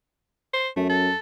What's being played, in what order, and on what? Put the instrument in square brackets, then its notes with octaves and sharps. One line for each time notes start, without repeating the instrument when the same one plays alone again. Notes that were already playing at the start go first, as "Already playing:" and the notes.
[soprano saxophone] C5
[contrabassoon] F#2 [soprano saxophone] A3
[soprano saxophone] A4